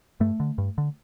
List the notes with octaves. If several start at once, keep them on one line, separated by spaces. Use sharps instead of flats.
G2 A3
D3
G2
D3